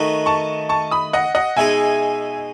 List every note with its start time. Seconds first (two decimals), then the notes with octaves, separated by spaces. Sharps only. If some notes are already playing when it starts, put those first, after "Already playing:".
Already playing: D#3 A3 D#4 F#4 B4
0.26 A5 C#6
0.69 A5 C#6
0.91 B5 D#6
1.13 D#5 F#5
1.35 D#5 F#5
1.57 B2 G#3 D#4 G#4 E5 G#5